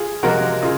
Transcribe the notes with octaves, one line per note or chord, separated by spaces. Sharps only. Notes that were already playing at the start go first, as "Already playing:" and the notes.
Already playing: F4 G#4
C3 F3 G#3 F#4 A#4
C#3 F4 G#4